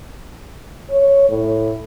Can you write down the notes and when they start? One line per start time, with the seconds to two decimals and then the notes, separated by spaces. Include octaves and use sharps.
0.90 C#5
1.29 A2